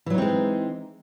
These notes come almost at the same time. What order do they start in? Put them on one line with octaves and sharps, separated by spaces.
E3 F#3 D#4 C4 G#3